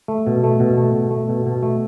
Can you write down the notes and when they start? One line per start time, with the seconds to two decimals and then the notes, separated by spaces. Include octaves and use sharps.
0.08 A3
0.27 B2
0.44 A3
0.60 B2
0.78 A3
0.95 B2
1.11 A3
1.29 B2
1.46 B2
1.63 A3